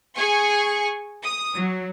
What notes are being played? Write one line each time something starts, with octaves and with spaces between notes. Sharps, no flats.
G#4 G#5 C#6
D#6
F#3